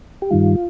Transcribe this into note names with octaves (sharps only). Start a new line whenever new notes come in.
G4
G2 D#3 G3 F4